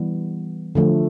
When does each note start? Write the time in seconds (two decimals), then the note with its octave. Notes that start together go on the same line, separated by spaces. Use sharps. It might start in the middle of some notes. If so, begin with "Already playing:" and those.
Already playing: E3 G3 B3
0.75 D3 F3 A3